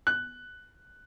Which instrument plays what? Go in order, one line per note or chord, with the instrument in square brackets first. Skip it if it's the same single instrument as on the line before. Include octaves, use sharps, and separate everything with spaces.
[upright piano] F#6